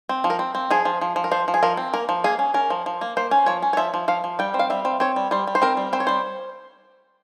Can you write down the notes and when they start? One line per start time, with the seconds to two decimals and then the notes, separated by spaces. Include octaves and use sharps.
0.09 C4
0.24 F3
0.30 A#4
0.39 C4
0.55 C4
0.70 F3 G#4
0.85 F3
1.01 F3
1.16 F3
1.24 A#4
1.31 F3 C5
1.48 F3
1.54 G#4
1.63 F3 A#4
1.77 C4
1.93 A#3 A#4
2.09 F3
2.24 A#3 G#4
2.39 C#4
2.54 C#4 A#4
2.70 F3
2.86 F3
3.01 A#3
3.17 A#3 C5
3.31 C#4
3.46 F3 C#5
3.62 C#4
3.73 C#5
3.77 F3 E5
3.94 F3
4.08 F3 F5
4.24 F3
4.39 G3 G5
4.54 C4
4.59 F5
4.70 G3 E5
4.85 C4
5.00 C4 C#5
5.16 G3
5.31 G3 C5
5.47 G3
5.55 C5
5.62 C4 A#4
5.77 G3
5.93 C4 C5
6.00 C#5
6.07 G3 C5